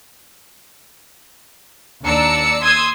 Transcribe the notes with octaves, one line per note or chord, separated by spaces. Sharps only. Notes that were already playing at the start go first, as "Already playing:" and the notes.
D#2 D4 D5 A#5 E6 C#7
C6 D#6 E6 G#6